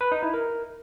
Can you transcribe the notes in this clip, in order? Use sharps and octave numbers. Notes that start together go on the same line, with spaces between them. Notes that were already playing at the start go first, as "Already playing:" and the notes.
B4
D#4
E4
A#4